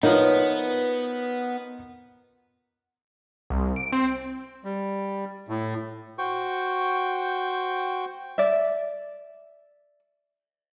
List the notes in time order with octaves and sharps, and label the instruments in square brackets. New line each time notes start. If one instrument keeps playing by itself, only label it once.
[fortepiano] F3 A#3 D#4 [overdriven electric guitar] B3 [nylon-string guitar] B4 C#5 E5
[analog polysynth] C2
D7
C4
[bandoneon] G3
A2
[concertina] F#4 C5 G5 C#6
[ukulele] D5 E5